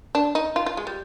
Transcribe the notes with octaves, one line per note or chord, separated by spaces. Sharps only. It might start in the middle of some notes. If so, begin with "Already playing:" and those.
D4
D#4
F4
F4
G#3
G3